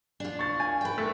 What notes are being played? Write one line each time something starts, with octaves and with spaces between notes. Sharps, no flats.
D4 F4
C#6 A6
G#5
B4 G5
A3